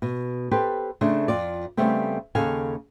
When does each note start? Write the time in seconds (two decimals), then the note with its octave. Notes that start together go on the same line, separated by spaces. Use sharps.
0.02 B2
0.51 G4 A4 B4 C5
1.01 C#3 A3 D4 C5
1.28 F2 F4 D5
1.77 C#3 G3 A3 B3 C4
2.35 D#2 C#3 A4 F5 G#5